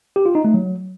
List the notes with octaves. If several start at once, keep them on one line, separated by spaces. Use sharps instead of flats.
G4
F4
D#4
A3
F#3